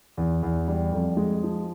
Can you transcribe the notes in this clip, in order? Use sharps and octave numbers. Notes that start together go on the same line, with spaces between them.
E2
E2
G3
F2
G#3
F3